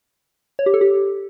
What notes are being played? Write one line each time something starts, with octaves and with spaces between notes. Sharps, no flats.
C#5
G4
A4
G4